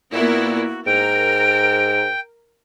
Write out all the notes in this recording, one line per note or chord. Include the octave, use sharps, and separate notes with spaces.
A#2 A#3 B3 E4 F#4
G#2 A#4 G5 D7